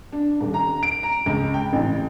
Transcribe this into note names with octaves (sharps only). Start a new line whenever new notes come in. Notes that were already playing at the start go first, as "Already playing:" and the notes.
D4
D#1
A#5
D7
A#5
C#2
G5
A1